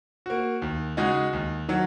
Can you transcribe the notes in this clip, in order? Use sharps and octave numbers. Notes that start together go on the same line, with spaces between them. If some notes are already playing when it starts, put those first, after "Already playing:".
A#3 F#4
D#2
C#3 G#3 D#4 F#4
D#2
D#3 F#3